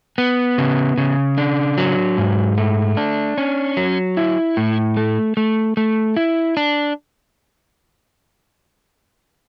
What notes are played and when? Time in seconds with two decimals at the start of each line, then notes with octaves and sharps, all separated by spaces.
0.18 B3
0.58 C#3
0.98 C#3
1.37 D4
1.78 F#3
2.18 G#2
2.57 A3
2.97 D4
3.38 C#4
3.77 F#3
4.17 E4
4.57 A2
4.97 A3
5.37 A3
5.77 A3
6.17 E4
6.57 D4